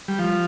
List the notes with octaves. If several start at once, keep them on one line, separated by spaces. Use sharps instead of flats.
G3
F3